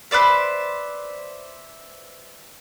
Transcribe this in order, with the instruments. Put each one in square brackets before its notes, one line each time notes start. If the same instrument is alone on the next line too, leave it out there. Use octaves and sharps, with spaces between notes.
[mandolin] B4 C5 D5 E5